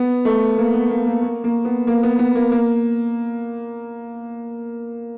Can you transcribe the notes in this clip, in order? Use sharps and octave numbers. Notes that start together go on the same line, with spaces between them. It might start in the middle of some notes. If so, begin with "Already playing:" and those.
Already playing: B3
A3
A#3
B3
A#3
A#3
A#3
A#3
B3
A#3
B3
B3
A#3
A#3